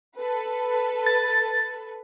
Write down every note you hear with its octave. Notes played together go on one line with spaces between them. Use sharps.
A4 B4
A6